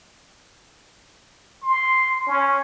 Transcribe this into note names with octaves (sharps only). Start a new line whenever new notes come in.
C6
C#4